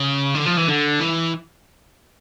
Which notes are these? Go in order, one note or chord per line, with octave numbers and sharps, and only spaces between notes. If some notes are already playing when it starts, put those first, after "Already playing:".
Already playing: C#3
D3
F3
E3
D3
E3